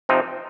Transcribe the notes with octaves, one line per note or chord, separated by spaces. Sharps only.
C3 F3 C4 D#4